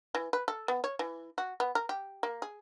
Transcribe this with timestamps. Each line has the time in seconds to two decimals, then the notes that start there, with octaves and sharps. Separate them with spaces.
0.15 E3
0.33 B4
0.48 A4
0.68 B3
0.84 C#5
0.99 E3
1.38 F#4
1.60 B3
1.75 A#4
1.89 G4
2.23 A#3
2.42 G#4